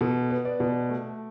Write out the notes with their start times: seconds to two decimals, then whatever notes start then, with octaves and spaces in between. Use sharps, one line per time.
0.01 B2 A4
0.30 B3
0.45 D5
0.60 B2
0.89 A3